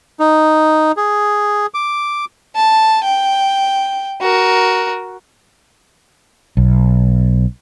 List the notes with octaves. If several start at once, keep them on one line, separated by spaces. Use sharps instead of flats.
D#4
G#4
D6
A5
G5
F#4 A#4
B1